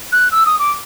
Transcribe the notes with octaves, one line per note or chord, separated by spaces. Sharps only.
F#6
E6
D#6
D6